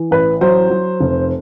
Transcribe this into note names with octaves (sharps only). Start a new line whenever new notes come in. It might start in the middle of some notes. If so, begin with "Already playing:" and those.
Already playing: E3
A1 B4
F#3 C5
F#3
F1